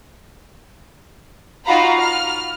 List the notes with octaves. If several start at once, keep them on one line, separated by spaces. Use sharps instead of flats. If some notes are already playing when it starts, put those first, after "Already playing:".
D#4 F4 F#4 F5 A#5 B5
F6